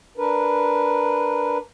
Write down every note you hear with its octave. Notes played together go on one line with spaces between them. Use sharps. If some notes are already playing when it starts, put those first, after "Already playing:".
D4 A#4 B4